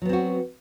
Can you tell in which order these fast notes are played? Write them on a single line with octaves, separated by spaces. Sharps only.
F#3 B3 C4 F#4